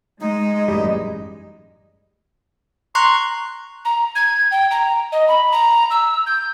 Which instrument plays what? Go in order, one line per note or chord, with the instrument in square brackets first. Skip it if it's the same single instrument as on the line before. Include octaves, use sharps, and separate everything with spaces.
[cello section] G#3 [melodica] D#4 [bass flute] D#5
[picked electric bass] A1 F#2 G3
[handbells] A#5 C#6 F#6 [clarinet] C6
[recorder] A#5
G#6
G5
A#5
D#5
B5
A#5
E6
G6